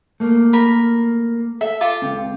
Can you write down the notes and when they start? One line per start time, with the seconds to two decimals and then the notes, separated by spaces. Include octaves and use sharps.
0.20 A3 A#3
0.53 A#4 B5
1.61 A4 E5
1.81 F4 A4 D6
2.02 C#2 C4